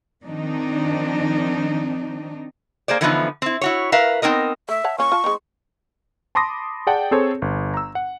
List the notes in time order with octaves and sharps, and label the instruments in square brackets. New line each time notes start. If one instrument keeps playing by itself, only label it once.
[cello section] D#3 F3 C4 D4 D#4
[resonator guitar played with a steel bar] A#3 G#4 C5 D5
D3 E3 F3 A3 B3 D#4
C4 E4
E4 F#4 C#5
A#4 B4 E5 F5
B3 C4 D#4 A#4 D#5
[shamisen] A3 [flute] E5
[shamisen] C#5 F#5 A5
[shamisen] F3 A#3 C#4 [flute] C#6
[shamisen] F4 A5
G#3 C4 D#4
[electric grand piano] A5 B5 C6 D6 D#6 A#6
G#4 D5 F#5 G5 A5
C4 G#4 A4 C5 C#5
G1
A#5 E6
F#5